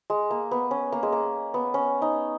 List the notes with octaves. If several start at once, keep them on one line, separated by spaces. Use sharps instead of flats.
G#3
A#3
B3
C#4
A#3
G#3
A#3
B3
C#4
D#4